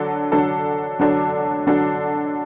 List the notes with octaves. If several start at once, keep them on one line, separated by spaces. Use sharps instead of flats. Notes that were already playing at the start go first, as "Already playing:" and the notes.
Already playing: D3 F#3 D4 A4
D3 F#3 D4 A4
D3 F#3 D4 A4
D3 F#3 D4 A4